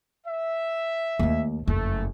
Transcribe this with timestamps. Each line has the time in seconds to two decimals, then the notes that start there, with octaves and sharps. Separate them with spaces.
0.27 E5
1.19 D#2 A3
1.67 F#1 F2 A3